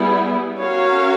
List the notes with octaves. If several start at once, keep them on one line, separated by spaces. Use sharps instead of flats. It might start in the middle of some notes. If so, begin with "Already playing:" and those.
Already playing: G3 B3 E4 G#4
C#4 F#4 A#4 C#5 F5